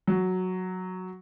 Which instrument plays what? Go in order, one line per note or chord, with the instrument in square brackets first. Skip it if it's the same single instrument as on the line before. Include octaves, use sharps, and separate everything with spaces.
[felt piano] F#3